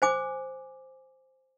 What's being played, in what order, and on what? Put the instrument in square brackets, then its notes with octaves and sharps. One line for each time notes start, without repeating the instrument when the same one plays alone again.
[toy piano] C5 G#5 D6